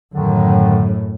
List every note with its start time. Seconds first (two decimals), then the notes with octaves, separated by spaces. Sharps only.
0.14 F#2 A2 D3 D#3